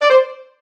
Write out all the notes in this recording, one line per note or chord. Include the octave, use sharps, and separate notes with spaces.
D5
C5